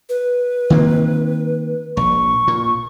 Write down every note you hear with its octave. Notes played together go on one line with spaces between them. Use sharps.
B4
D#3 A#3 C4
A#1 C#6
A#2